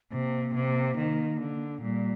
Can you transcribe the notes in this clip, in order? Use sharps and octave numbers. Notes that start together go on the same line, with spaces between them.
C3 A#3
C3
D#3
D3
A#2 G3